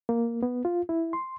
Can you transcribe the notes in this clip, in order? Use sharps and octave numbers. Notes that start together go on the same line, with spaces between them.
A#3
B3
F4
E4
C6